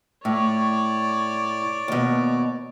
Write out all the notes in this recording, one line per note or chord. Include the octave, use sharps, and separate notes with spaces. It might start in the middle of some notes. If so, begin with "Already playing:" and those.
A2 C#5 D5
D#2 B2